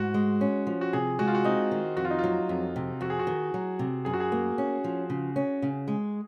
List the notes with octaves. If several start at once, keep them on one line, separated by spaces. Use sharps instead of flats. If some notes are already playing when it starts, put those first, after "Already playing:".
Already playing: G#2 F#4
G#3
C#4
F3
F#4
C3 G#4
G#3 F#4
F4
F#4
C4 D#4
D#3
F2 F#4
F4
D#4
F4
F#3
F2
C3
F2 F#4
G#4
F#4
D#3
F#3
C3
F#2 G#4
F#4
G#4
A#3
C#4
F3
C#3
C#4
C#3
G#3